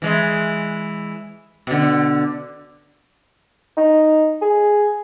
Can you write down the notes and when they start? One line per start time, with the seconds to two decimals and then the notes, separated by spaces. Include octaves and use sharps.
0.02 E3 G#3
1.67 B2 D3
3.77 D#4
4.42 G#4